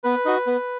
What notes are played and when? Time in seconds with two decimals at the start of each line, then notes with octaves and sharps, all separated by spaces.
0.04 B3 B4
0.25 D#4 F#4
0.47 B3